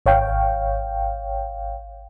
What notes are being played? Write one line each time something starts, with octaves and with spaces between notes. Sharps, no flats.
G#1 C#5 F5 G5